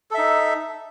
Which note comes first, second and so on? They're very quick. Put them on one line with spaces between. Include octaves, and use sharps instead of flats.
A4 E5 D#4